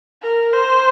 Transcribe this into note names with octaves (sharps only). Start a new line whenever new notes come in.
A#4
C5